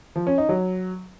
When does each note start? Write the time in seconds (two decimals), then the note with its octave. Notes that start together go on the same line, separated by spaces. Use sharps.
0.16 F3
0.27 C#4
0.38 D#4
0.49 F#3